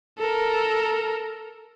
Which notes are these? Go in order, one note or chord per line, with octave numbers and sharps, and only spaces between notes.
A4 A#4